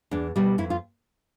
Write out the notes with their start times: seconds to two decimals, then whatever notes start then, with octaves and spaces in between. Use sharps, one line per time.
0.11 E2 D4
0.36 B2 G3
0.58 F2 E4
0.70 F4